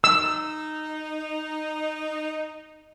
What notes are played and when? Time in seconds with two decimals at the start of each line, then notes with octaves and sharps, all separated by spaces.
0.04 D#4 E6